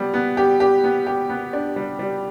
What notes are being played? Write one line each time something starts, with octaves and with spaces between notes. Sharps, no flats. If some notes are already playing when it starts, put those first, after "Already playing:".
Already playing: G3 B3
B3
G4
G4
B3
G4
B3
D4
G3
G3